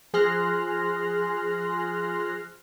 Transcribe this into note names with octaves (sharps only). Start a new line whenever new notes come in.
F3 G#4 C6 F6 F#6 A#6